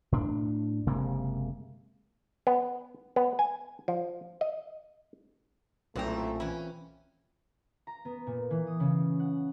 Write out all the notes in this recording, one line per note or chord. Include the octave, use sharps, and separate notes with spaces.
A2 D4
F#1 C3 G#3 A#3
B3
B3
G#5
F3
D#5
B1 F#2 A#2 A3 C4 E4 G5 A#5
E3 C#4 E4
A#5
B3
A#2
E3
D#6
C#3
F#5